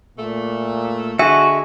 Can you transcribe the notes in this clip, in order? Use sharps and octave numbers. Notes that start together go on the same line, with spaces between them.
A#2 A3
D3 G#3 F#4 E5 G#5